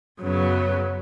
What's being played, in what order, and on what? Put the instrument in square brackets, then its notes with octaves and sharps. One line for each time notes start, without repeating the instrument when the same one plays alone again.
[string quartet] F#2 C#3 F#3 B3